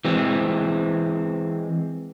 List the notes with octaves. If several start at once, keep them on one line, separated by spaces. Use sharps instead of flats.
E3 G#3 C4